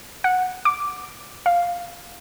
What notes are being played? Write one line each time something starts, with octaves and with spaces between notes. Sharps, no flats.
F#5
D6
F5